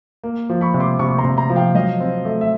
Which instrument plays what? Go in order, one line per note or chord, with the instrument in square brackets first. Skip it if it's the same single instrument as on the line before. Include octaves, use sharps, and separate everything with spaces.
[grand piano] A#3
F3
[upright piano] B5 C#6
[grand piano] C3
[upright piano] C6 D6
C6
[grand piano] C3 [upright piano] B5 C#6
[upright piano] C#6
A#5 C6
[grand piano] C3
[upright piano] A#5 C6
[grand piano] F3
[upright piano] F5 G5
[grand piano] F#3 [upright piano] D#5 F5
[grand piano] C4
A3
[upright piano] E5